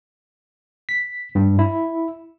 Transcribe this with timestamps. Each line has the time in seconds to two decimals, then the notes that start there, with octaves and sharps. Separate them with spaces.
0.89 B6
1.35 G2
1.59 E4